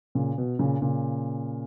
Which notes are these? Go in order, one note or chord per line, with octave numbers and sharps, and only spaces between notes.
A#2 C#3
B2
A#2 C#3
A#2 C#3